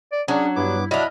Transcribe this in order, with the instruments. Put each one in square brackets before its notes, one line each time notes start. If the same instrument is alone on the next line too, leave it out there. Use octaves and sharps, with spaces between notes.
[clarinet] D5
[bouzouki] F#3 [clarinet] C#4 [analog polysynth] D4 [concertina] G#4
[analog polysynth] G2 [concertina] B3 D6 [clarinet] E4
[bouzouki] F#3 D4 [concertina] E4 B5 [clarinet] D#5 [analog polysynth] F6